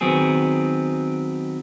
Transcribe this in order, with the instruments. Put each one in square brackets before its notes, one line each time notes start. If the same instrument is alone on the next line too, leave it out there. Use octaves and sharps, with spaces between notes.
[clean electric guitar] D#3 F#3 B3 C4 G#4